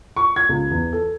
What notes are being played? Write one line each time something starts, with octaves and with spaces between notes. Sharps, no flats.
C#6
G#6
C#2
E2
A4